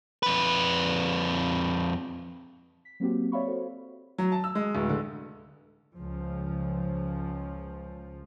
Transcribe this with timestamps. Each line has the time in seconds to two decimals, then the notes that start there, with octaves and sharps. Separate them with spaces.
0.23 F2 B4
2.85 B6
3.00 F#3 A#3 C4 F#4 G4
3.32 C#5 D5 E5 F5 B5 C#6
3.46 F#4 A4 C5
4.18 F#3
4.32 A5
4.44 E6
4.55 G#3
4.75 D1
4.89 D3
5.98 C#2 F3